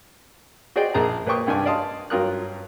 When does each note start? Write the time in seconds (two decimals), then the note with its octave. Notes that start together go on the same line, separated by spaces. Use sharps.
0.76 F#4 G#4 C5 D5 D#5 G5
0.94 A#1 G#4 A5 A#5
1.26 A#2 B4 C5 G5 C#6 D#6
1.47 C2 G2 D4 G#5 D6
1.65 D5 D#5 F5 A5 C6 D#6
2.10 G2 F#3 F4 A#4 D#6 F#6